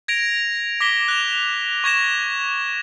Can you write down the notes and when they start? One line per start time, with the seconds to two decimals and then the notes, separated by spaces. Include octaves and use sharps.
0.08 G#6 A#6 D7 F7
0.81 D6 A#6 B6 G7
1.08 F#6 F7
1.84 C#6 G#6 A#6 E7